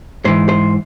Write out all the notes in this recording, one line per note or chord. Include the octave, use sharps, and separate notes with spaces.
G#2 E3 C5
C5